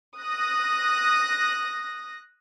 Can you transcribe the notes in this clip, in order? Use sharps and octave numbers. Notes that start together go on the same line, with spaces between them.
D#6 F#6 A#6